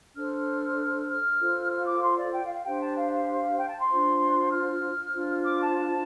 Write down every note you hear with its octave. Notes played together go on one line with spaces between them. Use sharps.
D4 A4 C5 F6
F6
F4 A4 C5
F6
D6
C6
D5
G5
F5
F5
D4 G4 C5 G5
A5
F5
F5
G5
A5
C6
D4 F4 C5
F6
D4 F4 C5
D6
A5